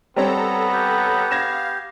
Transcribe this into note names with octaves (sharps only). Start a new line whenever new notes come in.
G3 B3 C4 A4 C#5 A#5
G4
F5 G#6 A#6 E7